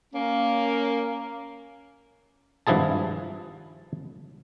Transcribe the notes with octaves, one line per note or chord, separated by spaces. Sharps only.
A#3 C#4
G#1 G2 F3 E4 G#4 A5